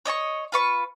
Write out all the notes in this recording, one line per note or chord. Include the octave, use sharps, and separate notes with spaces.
C#5 D#5 A5 C#6
F4 B4 C#6